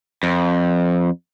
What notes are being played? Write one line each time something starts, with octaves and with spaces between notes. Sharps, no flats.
F2